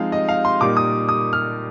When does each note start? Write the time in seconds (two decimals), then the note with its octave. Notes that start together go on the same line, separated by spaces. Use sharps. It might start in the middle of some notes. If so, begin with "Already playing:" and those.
Already playing: F3 G#3 C4 D#4 F5
0.12 D#5
0.29 F5
0.45 C6
0.61 A#2 G3 A#3 D#4 D6
0.77 D#6
1.09 D#6
1.33 F6